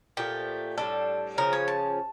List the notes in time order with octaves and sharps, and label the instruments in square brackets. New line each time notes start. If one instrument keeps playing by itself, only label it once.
[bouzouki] A#2 F3 A3 [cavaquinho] G4
[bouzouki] A2 G3 D4 [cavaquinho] A4
[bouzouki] C#3 F3 C#4 F4 [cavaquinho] A#4
[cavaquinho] C#5
A5